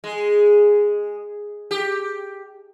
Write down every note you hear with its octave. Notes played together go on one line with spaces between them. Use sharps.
G#3
G4